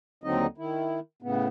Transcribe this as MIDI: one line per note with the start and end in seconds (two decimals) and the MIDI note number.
0.24 0.46 39
0.24 0.46 50
0.24 0.46 54
0.24 0.46 60
0.24 0.46 63
0.24 0.46 75
0.58 1.00 51
0.58 1.00 64
1.22 1.48 45
1.22 1.48 49
1.22 1.48 59